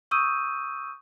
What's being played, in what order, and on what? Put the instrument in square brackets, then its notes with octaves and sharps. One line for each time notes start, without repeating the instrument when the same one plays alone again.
[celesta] C#6 D#6 E6 G6 D#7